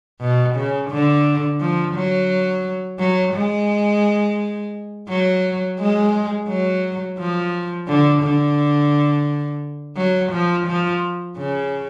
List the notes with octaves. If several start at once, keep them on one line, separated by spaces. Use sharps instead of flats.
B2
C#3
D3
F3
F#3
F#3
G#3
F#3
G#3
F#3
F3
D3
D3
F#3
F3
F3
C#3